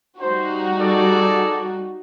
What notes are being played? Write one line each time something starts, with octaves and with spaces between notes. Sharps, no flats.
G3 D#4 F#4 C5
G#4 A4 D5